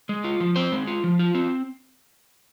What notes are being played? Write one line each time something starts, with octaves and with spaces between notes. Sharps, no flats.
G#3
F4
F3
C4 C5
G#3
F4
F3
F4
C4